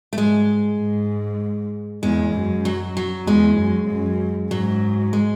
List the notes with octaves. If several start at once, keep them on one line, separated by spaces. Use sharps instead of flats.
A3
G#2 G#3
G#2
E2 G#3
F#2
F#3
F#3
E2 G#3
F#2
F#2
G#2 F#3
G#3